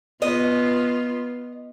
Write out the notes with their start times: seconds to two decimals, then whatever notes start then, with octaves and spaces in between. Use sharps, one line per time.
0.22 B3 F4 D#5